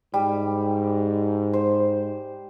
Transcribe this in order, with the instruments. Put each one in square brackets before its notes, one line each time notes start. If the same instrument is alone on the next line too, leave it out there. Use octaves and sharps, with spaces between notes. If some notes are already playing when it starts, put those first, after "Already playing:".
[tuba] G#2 [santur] G3
[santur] C5